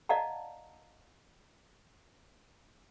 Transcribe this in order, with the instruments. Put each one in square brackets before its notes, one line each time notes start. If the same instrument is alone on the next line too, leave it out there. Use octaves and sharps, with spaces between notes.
[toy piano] D5 D#5 F5 F#5 A5 A#5